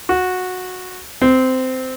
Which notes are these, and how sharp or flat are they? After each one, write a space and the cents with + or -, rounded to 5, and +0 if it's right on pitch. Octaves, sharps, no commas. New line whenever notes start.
F#4 -15
C4 -15